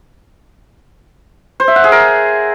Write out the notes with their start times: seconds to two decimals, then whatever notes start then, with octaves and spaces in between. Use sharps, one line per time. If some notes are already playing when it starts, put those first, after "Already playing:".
1.60 C5
1.68 E5
1.76 F#5
1.84 G#4
1.92 A#4